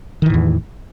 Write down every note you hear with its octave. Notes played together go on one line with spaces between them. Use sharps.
E2 A2 D#3 E3